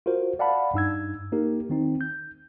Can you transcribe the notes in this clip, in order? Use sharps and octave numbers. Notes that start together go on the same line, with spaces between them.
F4 F#4 A#4 C5
D5 F5 F#5 A5 B5
G2 D#4 E6 G#6
A#3 D#4 G4 A#4
D#3 C4 D#4
G6